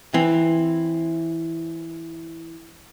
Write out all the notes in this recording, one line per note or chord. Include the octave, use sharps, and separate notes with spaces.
E3 C4